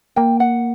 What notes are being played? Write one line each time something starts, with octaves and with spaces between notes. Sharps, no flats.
A#3 G5
F#5